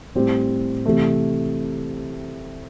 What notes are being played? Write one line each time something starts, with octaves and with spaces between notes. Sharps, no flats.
A2 G3 C4 G4 C5
C3 E3 A3